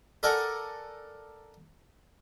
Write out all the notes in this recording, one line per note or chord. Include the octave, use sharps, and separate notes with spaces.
A4 A#4 D5 F#5 G#5 A#5